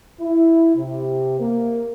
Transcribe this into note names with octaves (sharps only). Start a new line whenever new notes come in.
E4
C3
A#3